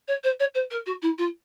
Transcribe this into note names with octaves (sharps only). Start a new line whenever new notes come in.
C#5
C5
C#5
C5
A#4
F#4
E4
F4